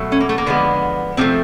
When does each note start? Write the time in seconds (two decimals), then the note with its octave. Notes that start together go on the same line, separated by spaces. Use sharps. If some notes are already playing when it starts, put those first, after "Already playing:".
Already playing: B2 F#3 A3
0.12 C#4
0.20 A#3
0.29 A3
0.38 A#3
0.46 D3 F3 G#3 B3
1.17 C3 F3 A3 C4